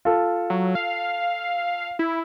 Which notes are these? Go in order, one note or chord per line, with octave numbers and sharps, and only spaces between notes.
F4 A4
F#3
F5
E4